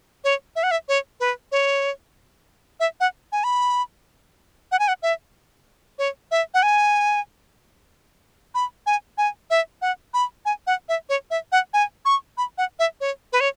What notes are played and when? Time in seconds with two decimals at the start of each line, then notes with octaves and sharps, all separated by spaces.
0.24 C#5
0.56 E5
0.63 F#5
0.71 E5
0.88 C#5
1.20 B4
1.52 C#5
2.80 E5
3.00 F#5
3.32 G#5
3.44 B5
4.72 F#5
4.79 G#5
4.88 F#5
5.03 E5
5.98 C#5
6.31 E5
6.54 F#5
6.63 G#5
8.55 B5
8.86 G#5
9.18 G#5
9.50 E5
9.82 F#5
10.14 B5
10.45 G#5
10.67 F#5
10.89 E5
11.09 C#5
11.30 E5
11.52 F#5
11.73 G#5
12.05 C#6
12.37 B5
12.58 F#5
12.79 E5
13.00 C#5
13.33 B4
13.40 C#5